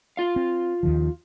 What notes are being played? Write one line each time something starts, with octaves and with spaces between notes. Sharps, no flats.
F4 F5
C4
D#2 D#3 F3